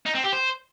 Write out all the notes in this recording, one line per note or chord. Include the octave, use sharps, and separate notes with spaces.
D#4
C4
G4
C5